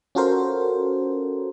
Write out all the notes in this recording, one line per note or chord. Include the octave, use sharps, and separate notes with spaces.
C#4 F4 F#4 A4 A#4 C5